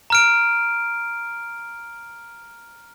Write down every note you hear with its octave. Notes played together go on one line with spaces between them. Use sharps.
A#5 F6 D7